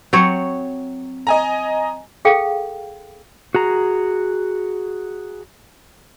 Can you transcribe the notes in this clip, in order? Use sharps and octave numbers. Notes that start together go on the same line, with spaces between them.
F#3 C4 C#5
D#5 G#5 A#5
G#4 A4 F5 G5
F#4 G#4 A#5